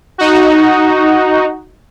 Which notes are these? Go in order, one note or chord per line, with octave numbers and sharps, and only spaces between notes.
D#4 F#4